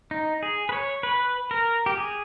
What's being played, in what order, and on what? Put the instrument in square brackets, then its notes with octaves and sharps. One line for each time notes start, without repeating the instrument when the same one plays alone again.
[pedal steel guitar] D#4
G#4
B4
C#5
B4
A#4
G4
G#4